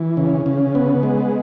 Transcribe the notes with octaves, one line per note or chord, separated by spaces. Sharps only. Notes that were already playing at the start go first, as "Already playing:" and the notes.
Already playing: E3
C#3
C#3
B3
G#3